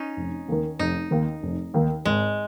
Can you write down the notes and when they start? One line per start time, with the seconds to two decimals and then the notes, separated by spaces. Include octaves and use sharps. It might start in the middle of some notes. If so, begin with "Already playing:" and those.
Already playing: C#4 D#4
0.17 F1
0.48 D#2 D#3
0.79 F1 D#4
1.11 D#2 D#3
1.43 F1
1.74 D#2 D#3
2.05 G#1 G#3